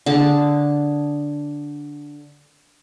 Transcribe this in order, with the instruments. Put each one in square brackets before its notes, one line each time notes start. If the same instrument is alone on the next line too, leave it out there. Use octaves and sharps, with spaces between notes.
[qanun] D3 G#4 A5